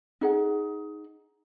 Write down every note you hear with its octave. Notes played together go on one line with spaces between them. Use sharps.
D#4 G#4 F#5